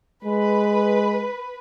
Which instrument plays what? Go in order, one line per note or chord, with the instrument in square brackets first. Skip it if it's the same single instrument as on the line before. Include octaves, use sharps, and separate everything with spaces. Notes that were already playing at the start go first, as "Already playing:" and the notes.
[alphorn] G#3 [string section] B4